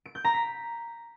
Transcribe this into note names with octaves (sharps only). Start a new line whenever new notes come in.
D7
G6
A#5
B6